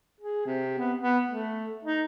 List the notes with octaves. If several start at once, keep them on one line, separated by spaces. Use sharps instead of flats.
G#4
C3
B3
B3
A3
D#4